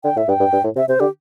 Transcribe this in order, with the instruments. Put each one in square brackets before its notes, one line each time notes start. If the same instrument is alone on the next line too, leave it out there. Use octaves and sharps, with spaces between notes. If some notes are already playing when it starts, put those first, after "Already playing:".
[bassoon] D3 [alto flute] G5
[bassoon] A2 [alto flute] E5
[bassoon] G2 [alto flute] G5
[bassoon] G2
G2
A2
[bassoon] C3 [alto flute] E5
[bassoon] C3 [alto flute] C5
[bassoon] D3 [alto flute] G4